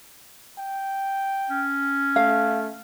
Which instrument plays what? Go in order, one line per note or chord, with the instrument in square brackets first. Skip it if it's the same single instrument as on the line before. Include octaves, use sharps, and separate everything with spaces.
[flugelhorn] G5
[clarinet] C#4
[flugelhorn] A3 [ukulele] F5